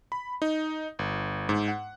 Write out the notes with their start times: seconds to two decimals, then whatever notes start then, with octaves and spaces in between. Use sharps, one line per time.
0.12 B5
0.42 D#4
0.99 G1
1.49 G#2
1.68 F#5